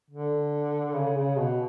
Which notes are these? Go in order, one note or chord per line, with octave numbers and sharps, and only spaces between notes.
D3
C#3
C#3
B2